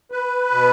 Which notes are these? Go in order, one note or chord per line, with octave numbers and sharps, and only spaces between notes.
B4
B2